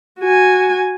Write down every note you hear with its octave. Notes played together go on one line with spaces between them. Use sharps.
F#4 G#5